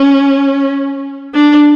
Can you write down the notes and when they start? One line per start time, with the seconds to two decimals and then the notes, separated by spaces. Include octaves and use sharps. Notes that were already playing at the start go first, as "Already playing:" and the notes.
Already playing: C#4
1.34 D4